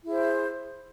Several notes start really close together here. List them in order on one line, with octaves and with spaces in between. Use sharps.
E4 G#4 C5